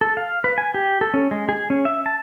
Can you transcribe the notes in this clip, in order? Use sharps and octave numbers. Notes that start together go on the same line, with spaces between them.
A4
F5
B4
G#5
G4
A4
C#4
G#3
G#4
C#4
E5
A5